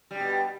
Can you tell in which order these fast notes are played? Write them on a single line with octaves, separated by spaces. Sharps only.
G3 G2 B2